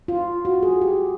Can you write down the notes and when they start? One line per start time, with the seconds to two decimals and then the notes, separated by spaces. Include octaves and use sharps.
0.08 F4
0.45 F#4
0.63 G#4
0.82 G4